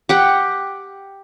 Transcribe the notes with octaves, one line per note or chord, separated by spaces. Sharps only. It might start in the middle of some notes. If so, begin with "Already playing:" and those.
G4 F#5 G5